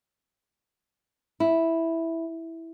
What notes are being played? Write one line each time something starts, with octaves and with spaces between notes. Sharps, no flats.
E4